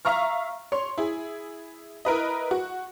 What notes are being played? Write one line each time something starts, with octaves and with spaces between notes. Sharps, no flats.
E5 F5 A#5 C#6 F6
C#5 C6
E4 G#4
E4 A#4 B4 D#5
F#4